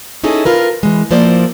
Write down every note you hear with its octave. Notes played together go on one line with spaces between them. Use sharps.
C#4 D#4 E4 G#4 A4
F4 A#4 B4
E3 G#3
F3 A#3 E4 C5 D5